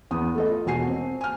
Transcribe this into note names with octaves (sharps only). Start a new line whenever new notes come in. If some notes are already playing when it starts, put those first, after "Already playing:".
E2 B3 D#6
A3 A4 D#5
F4
E1 B2 F#4 G#5 C7
C4
G#5 F6